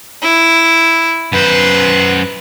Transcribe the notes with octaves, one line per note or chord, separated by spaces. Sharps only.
E4
F#2 B4 C5